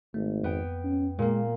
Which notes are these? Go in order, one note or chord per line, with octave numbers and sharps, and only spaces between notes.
G#1 A3
F2 B3 G5
C#4
A#2 G#3 A#3